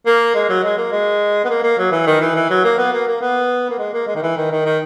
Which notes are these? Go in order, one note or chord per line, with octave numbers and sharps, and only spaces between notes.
A#3
G#3
F#3
G#3
A#3
G#3
B3
A#3
A#3
F#3
E3
D#3
E3
E3
F#3
A#3
B3
A#3
A#3
B3
A#3
G#3
A#3
G#3
D#3
E3
D#3
D#3
D#3